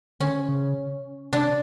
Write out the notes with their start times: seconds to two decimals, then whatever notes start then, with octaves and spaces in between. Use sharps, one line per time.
0.20 D3 C#4
0.48 C#3
1.32 C3 D4